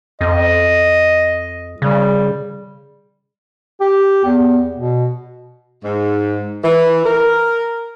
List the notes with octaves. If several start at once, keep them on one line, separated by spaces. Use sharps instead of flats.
F2 D#5
C#3 G3
G4
E2
B2
G#2
E3
A#4